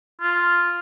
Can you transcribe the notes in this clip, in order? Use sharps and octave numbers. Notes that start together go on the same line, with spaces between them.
F4